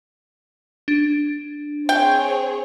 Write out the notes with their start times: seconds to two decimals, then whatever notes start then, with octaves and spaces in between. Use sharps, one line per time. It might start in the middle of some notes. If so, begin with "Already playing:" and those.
0.88 D4
1.89 C4 G#4 C#5 G5